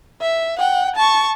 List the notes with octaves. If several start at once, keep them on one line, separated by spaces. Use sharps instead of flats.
E5
F#5 G5
A5 C#6